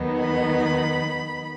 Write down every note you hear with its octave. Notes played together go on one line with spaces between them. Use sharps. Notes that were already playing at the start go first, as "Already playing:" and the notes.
Already playing: D#2 D#3 F#3 B3 D#4
B5